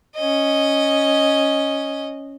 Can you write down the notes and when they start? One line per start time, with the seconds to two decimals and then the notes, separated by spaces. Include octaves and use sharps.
0.16 C#4 D#5